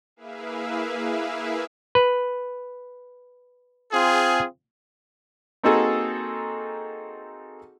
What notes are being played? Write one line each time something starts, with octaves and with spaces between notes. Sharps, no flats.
A#3 E4 G#4 B4 E5 F5
B4
C4 F4 G#4
A#3 C4 D#4 F#4 G#4 A4